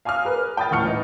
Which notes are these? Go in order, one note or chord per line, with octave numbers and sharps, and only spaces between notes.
F5 G#5 D6 D#6 F6
G#4 A#4 B4
G5 B5 D#6 G6 A6
D#1 A2 F#5 C#6 F6 C#7
E3 D#4